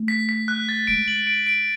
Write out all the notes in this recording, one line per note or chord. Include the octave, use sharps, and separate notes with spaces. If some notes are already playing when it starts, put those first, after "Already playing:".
Already playing: A3
B6
B6
F#6
A6
G#3 D7
F#7
D7
D7